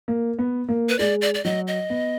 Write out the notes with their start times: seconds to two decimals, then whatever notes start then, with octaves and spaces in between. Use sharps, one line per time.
0.08 A#3
0.39 B3
0.69 A#3
0.89 B4
0.99 G#3 D5
1.22 D5
1.34 D5
1.44 F#3 D#5
1.67 D#5
1.90 B3